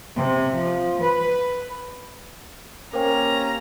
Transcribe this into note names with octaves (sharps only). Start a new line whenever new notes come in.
C3
F3
B4
A#3 C4 C#4 G4 A#4 C5 G5 A#5